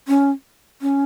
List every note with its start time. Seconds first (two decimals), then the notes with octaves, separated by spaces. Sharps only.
0.08 C#4
0.82 C#4